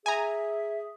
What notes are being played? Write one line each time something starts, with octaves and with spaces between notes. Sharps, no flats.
G#4 E5 G#5 A#5